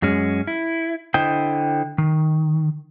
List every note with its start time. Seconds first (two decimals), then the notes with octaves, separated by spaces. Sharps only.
0.02 F#2 G#3 C#4
0.47 E4
1.14 D3 E4 C5 D#5 G5
1.98 D#3